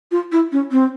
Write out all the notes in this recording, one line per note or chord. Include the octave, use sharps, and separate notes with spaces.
F4
E4
C#4
C4